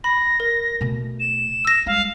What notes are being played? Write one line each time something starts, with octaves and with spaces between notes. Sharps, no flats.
B5 A#6
A#4
B2 A3
E7
E6 A#6
G3 G#3 F5